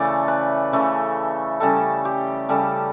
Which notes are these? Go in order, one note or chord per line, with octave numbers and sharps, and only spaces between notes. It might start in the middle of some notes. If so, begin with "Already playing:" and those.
Already playing: C#3 E3 A3 D5
B4
C#3 E3 A3
C#3 G3 A4
G4
C#3 G3 A4